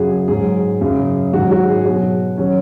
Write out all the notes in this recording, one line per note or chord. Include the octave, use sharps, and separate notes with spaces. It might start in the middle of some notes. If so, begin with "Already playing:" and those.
Already playing: F#2 C#3 F#3 F#4 G#4
G#4
G#2 F#3 G#4
F#2 C#3 F#3
G#2 D#3 F#3 F#4
F#4
G#4
B2 F#3 F#4
D#3 F#3 C#4